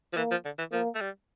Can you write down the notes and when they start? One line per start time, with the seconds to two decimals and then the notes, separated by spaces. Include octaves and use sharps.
0.13 F3
0.17 E3 A#3
0.31 F3
0.45 D3
0.58 E3
0.72 F3 A#3
0.95 A3
1.01 G3